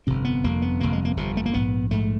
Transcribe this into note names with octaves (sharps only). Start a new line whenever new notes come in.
G1 F2 C3 C4
B3
G1 F2 C3 A#3
B3
G1 F2 C3 A#3
G#3
A#3
G1 F2 C3
A3
A#3
A#1 G#2 B3
A#1 G#2 A3